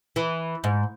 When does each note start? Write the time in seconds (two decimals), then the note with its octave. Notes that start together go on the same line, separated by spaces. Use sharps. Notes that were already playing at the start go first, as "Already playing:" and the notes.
0.16 E3
0.64 G#2